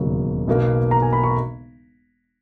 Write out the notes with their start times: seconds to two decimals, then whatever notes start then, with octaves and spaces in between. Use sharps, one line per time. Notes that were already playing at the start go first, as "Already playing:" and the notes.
Already playing: E1 D#2 C#3 F#3 A#3
0.47 B1 B2 A#3
0.91 A#5
1.02 G#5
1.13 B5
1.23 C#6